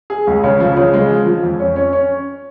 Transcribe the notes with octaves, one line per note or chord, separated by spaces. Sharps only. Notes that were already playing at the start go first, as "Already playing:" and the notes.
G#4
C#2
C#3
F3
C#3
G#3
F3
F3
F2
C#4
C#4
C#4